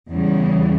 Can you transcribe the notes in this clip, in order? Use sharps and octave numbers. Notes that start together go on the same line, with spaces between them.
E2 C#3 E3 G3